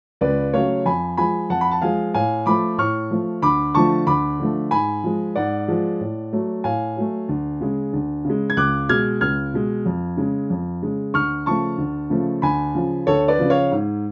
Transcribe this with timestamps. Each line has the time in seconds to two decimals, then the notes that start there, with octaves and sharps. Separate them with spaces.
0.21 C#2 B4 D5
0.53 C#3 F#3 A3 C#5 F5
0.85 F2 G#5 B5
1.17 F3 G#3 G#5 B5
1.50 F2 F#5 A5
1.61 B5
1.71 A5
1.82 F3 G#3 F5 G#5
2.14 A2 F5 G#5
2.46 F3 A3 B5 D6
2.78 A2 C#6 F6
3.11 F3 A3
3.42 D2 B5 D6
3.74 D3 F3 A3 A5 C#6
4.07 D2 B5 D6
4.39 D3 F3 A3
4.71 G#2 G#5 B5
5.04 F3 G#3
5.35 G#2 D5 F#5
5.68 F3 G#3
6.01 A2
6.33 F#3 A3
6.64 A2 F5 G#5
6.96 F#3 A3
7.29 D2
7.61 C#3 G#3
7.93 D2
8.25 C#3 G#3
8.50 G#6
8.57 C#2 D6 F#6
8.89 B2 G#3 F6 G#6
9.21 C#2 F6 G#6
9.54 B2 G#3
9.86 F2
10.17 C#3 G#3
10.50 F2
10.82 C#3 G#3
11.14 D2 C#6 F6
11.46 C#3 F3 A3 A5 C#6
11.78 D2
12.10 C#3 F3 A3
12.42 D2 G#5 B5
12.75 C#3 F3
13.07 D2 A4 C#5
13.28 B4 D5
13.39 C#3 F3
13.50 C#5 F5
13.71 G#2